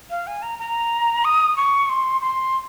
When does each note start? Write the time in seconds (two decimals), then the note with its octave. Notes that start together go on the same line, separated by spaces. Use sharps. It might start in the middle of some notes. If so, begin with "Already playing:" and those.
0.10 F5
0.27 G#5
0.42 A#5
0.59 A#5
1.25 D#6
1.57 C#6
1.89 C6
2.22 C6